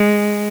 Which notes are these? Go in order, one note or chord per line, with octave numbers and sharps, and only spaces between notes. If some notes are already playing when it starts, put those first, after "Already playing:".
Already playing: G#3